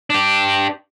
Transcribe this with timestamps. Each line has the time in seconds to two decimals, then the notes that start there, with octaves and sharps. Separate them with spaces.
0.10 D4 G4